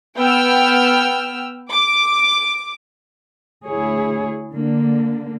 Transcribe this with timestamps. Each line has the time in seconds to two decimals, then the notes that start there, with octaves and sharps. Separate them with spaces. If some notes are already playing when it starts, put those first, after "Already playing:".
0.17 B3 G5 E6 F6
1.72 D6
3.66 D2 E4 G#4 C#5
4.53 D3 A#3 D4